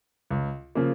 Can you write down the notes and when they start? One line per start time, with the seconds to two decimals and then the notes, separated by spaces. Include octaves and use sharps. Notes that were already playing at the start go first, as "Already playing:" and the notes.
0.31 C#2
0.75 C#3 F3 A#3